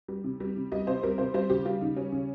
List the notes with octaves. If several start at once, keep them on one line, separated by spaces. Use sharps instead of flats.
G3
C3
G3
C3
G3 D#5
C3 C5
G3 A#4
C3 C5
G3 C5
C#3 G4
G3 F4
C#3 D#4
G3 C#4
C#3